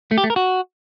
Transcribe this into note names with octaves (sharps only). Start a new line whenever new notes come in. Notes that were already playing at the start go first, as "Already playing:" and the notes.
A3
G4
A3
A#4
F#4